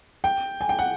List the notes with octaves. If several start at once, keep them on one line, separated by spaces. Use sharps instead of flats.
G5
G#5
G5
F#5